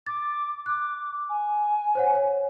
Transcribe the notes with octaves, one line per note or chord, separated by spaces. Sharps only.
D6 A6
D6 F#6
G#5
C5 C#5 F#5
C#5